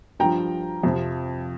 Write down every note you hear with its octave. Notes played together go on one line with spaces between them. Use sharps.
G2 F3 G5 A#5
F2 C3 F3